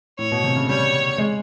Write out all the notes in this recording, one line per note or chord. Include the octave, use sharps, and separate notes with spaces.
A2 C#5
B2
C3
C#3
G3 C#5
G#3